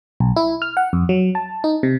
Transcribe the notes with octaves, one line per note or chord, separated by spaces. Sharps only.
B1
E4
F6
F#5
F2
F#3
A5
D#4
C3